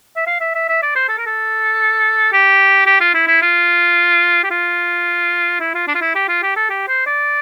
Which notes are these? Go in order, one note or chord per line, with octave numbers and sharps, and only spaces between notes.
E5
F5
E5
E5
E5
D5
C5
A4
A#4
A4
G4
G4
F4
E4
E4
F4
G4
F4
E4
F4
D4
F4
E4
G4
F4
G4
A4
G4
C5
D5